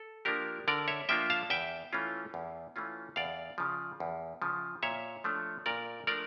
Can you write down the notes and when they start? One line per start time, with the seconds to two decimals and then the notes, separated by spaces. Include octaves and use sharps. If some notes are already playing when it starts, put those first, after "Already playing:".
Already playing: A4
0.25 F3 A#3 D4 F4 G4 A#4
0.68 D3 A#4 D5
0.88 C#5 E5
1.09 F3 A#3 D4 F4 E5 G5
1.30 F5 A5
1.50 E2 E5 G5
1.93 E3 A3 C#4 F4
2.34 E2
2.76 E3 A3 C#4 F4
3.16 E2 D5 F5
3.58 C#3 F3
4.00 E2
4.42 C#3 F3
4.83 A#2 C#5 E5
5.24 F3 A3 D4
5.66 A#2 A#4 D5
6.07 F3 A3 D4 A#4 D5